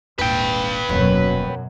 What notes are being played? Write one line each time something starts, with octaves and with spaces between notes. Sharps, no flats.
D#1 G#1 B4 G5
D#1 F#2 B2 F#3